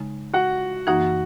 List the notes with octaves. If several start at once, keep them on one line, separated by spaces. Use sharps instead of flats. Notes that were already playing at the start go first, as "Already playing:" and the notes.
Already playing: C#3 G#3 D#4
F#4 F#5
F#2 E3 A#3 D#4 F#4 F#5